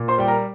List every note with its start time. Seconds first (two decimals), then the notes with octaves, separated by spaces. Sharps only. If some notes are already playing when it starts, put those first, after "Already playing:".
Already playing: A#2
0.08 C5 C6
0.18 G3 G5
0.28 A#4 A#5